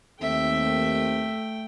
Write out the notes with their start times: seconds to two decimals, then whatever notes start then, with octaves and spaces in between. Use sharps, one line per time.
0.21 D#2 A3 C4 E5 G5